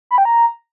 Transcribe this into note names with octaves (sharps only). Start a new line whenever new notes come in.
B5
G5
A#5